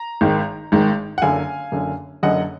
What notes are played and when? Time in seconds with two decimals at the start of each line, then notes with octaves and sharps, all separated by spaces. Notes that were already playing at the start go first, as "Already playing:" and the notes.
Already playing: A#5
0.21 G#1 G#2 D#3
0.72 G#1 G#2 D#3
1.18 F#5
1.22 F#1 F#2 D3 F5 G#5
1.72 F#1 F#2 D3
2.23 F#1 F#2 D3 D#5 F#5